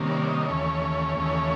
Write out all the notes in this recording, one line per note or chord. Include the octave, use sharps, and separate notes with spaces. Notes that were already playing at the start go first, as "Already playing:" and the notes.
Already playing: C3 D#3 G3 A#3 C#4
D5
D#5
D#2 C#3 E3 A3 C#4 C#5
D#2 C#3 E3 A3 C#4